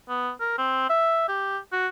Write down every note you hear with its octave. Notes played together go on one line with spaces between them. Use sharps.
B3
A#4
C4
E5
G4
F#4